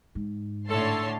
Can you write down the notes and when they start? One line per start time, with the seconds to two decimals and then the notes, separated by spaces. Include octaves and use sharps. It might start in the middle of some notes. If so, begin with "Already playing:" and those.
0.15 G#2
0.69 A2 D3 A4 C#5 A5 C6